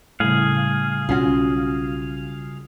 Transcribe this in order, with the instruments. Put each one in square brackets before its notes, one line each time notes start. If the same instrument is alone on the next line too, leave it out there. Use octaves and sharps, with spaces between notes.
[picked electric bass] A2 [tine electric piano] C#3 G3 [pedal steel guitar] G#4 F5
[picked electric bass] B1 C#4 [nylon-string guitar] F4 F#4